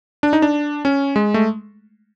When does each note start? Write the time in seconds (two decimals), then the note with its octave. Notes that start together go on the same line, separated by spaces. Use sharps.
0.23 D4
0.33 D#4
0.42 D4
0.85 C#4
1.16 G#3
1.34 A3